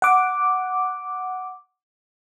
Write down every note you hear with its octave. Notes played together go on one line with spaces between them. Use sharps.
F#5 D6